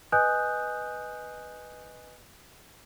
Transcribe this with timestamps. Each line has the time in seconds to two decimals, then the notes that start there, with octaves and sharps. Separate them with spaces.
0.12 B4 D#5 G#5 D#6 F#6 G6